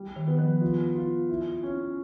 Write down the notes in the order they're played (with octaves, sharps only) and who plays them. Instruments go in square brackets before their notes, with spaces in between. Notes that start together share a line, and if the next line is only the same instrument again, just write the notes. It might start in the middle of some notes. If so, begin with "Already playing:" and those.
Already playing: [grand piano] G3
[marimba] D#3
[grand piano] B3
[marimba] F3
[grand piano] F4
F4
E4
C#4